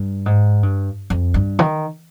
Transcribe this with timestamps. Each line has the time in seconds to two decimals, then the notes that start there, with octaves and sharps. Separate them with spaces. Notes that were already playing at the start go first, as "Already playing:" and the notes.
Already playing: G2
0.26 G#2
0.63 G2
1.10 F2
1.34 G2
1.59 D#3